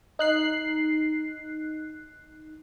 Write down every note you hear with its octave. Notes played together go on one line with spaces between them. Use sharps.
D#4 F#6 C7